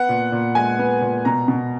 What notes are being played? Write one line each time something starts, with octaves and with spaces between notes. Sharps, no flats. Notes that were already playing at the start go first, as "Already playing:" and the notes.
Already playing: B3 F#5
A#2
A#2
G#3 G#5
B3
A#2
B2 A#5
B2